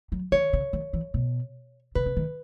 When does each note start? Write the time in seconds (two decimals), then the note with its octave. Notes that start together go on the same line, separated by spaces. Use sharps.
0.12 F#3
0.32 D#3 C#5
0.53 C#3
0.73 D#3
0.93 E3
1.14 B2
1.95 C#3 B4
2.06 C#3
2.16 D#3